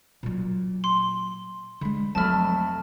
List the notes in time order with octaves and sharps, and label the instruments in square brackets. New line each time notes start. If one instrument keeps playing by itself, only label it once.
[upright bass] A#2 F#3
[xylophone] C6
[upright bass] D3 G#3 [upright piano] B5
[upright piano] F1 A3 B5 [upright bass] F#3 E4 [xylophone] A5 F6